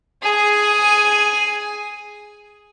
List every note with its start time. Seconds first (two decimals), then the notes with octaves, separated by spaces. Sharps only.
0.23 G#4 G#5